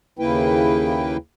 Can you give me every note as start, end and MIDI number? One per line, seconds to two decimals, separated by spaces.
0.19 1.17 39
0.19 1.17 49
0.19 1.17 58
0.19 1.17 64
0.19 1.17 71
0.19 1.17 79